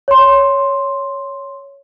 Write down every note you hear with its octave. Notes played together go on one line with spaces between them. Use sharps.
C#5 C6